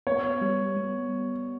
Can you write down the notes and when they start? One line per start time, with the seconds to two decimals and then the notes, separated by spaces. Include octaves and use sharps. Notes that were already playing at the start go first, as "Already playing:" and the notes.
0.07 B3 C#5
0.41 G3
0.77 G3